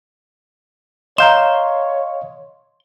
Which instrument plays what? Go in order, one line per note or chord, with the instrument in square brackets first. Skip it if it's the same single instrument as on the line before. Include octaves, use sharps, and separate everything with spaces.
[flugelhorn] C#5 [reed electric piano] D#5 F5 [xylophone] A#5 G6 E7 [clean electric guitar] C6